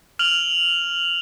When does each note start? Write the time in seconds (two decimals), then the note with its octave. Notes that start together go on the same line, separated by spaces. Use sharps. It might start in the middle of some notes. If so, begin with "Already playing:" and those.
0.19 F6 F7 F#7